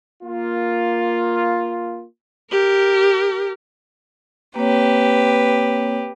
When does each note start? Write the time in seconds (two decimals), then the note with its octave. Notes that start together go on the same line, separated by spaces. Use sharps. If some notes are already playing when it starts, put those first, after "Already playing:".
0.23 A#3 F4
2.51 G4 A#4
4.56 A#3 C4 G4 B4 C#5